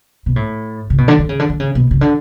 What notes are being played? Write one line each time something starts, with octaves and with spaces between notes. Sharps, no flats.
B2
A2
C#3
B2
D3
D3
C#3
D3
D3
C#3
B2
C#3
D3